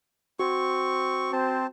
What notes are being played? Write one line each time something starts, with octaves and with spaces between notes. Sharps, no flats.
C4 F#4 C#6
C4 C5 A5